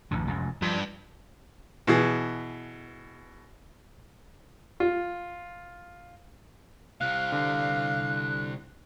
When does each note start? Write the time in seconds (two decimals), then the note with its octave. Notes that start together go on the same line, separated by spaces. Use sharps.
0.11 A1 F2 D3
0.27 F1 C#2 F#2
0.62 G2 F3
1.87 B2 E3 G#4
4.80 F4
7.01 C2 C3 F5 F#6
7.32 D3